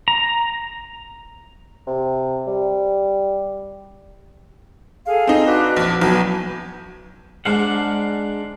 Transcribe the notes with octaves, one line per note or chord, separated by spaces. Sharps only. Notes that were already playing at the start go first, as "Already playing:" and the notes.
A#5
C3
G3
G#4 A4 F5
C4 D#4
D4 F#4 B4
A#1
B1 C#4 B4 G6
G#2 D4 F5 F#5